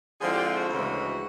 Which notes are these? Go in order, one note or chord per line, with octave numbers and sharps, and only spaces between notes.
D3 F3 G#3 C4 E4 G#4
G4
F4
F#4
D2 C#3 E3 G#3